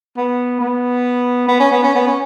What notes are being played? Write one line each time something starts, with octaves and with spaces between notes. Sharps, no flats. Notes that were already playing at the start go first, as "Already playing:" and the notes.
B3
B3
B3
C#4
B3
C#4
B3
C#4